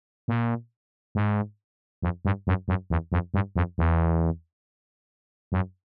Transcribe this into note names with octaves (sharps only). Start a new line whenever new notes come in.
A#2
G#2
F2
G2
F#2
F#2
E2
F2
G2
F2
E2
F#2